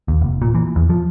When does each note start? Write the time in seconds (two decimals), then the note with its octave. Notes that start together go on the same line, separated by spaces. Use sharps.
0.08 D#2
0.21 F1
0.42 A#2
0.55 E3
0.76 E2
0.89 F3